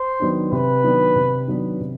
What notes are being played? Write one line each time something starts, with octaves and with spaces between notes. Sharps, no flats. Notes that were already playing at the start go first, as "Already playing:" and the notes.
Already playing: C5
D#3 F#3 B3 D4
C3 B4
D#3 F#3 B3 D4
C3
D#3 F#3 B3 D4
C3